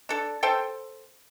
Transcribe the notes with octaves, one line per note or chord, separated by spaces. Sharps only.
D4 A4
A4 C5 G5 A5